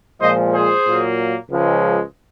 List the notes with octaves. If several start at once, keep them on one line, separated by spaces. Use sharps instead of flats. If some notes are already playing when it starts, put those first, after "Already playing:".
A#2 F3 G#3 C5 D#5
G#4 C5
A#2 F#3 A#3
C#2 C#3 F3 G#3